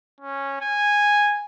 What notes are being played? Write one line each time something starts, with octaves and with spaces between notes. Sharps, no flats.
C#4
G#5